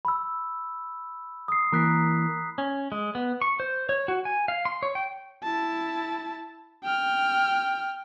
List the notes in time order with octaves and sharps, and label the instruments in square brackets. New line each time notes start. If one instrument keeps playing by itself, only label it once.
[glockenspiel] B5 E6
D#6 C7
[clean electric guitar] E3 A#3 A#4 [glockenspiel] A#5 F#6 B6
[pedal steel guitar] C#4
G#3
B3
C#6
C5
C#5
F#4
G#5
F5
C6
C#5
G5
[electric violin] E4 A5
G5 F6